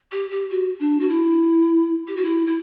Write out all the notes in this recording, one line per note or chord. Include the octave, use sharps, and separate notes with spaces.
G4
G4
F#4
D4
F#4
E4
G4
F#4
E4
E4